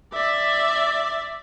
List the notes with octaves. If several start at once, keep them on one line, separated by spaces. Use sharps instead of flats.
D5 E5